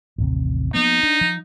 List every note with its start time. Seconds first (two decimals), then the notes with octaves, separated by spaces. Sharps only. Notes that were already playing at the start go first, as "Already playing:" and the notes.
0.18 A1 D#2 C3
0.74 F3 A#3 B3 D#4
1.03 D4
1.21 F3